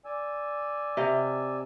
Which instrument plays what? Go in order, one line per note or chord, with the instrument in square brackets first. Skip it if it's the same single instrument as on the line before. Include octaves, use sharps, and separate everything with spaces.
[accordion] D5 G#5 E6
[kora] C3 D#5 F5